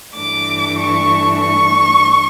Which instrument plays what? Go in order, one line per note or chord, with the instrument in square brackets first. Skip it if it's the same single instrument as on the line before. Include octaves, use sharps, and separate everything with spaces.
[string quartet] G2 E3 A3 D4 D6
C#6
C#6